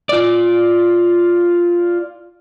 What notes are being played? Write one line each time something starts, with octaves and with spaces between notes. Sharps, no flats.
F4 D5